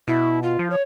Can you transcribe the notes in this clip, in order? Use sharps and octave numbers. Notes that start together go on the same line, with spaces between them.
B2 E4
F4
F3
C#5